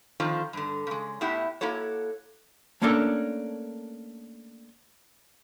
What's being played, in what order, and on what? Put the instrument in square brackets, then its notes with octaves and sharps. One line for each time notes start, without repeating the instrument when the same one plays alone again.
[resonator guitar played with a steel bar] D3 D#3 F3 C4 F4
G2 D3
C#3 G#3
A2 B3 E4 G4 F#5
A#3 E4 F#4 A4 C#5
[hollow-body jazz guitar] A3 A#3 C#4 D4 A4 A#4